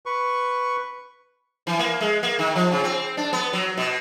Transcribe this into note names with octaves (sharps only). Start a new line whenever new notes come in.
B4 C#6
E3
A#3
G#3
A#3
D#3
F3
C#3
C4
D4
B3
F#3
B2